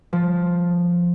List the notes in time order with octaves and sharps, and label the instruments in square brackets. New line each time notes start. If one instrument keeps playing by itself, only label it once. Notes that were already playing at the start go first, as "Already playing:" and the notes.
[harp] F3